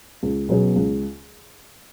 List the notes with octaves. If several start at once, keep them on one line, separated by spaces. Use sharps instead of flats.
C#2
B2 F#3 C#4 G#4
C#2